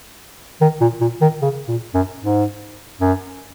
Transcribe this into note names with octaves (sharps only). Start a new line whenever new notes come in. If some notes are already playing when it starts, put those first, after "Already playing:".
D#3
A#2
A#2
D#3
C#3
A#2
F#2
G#2
F#2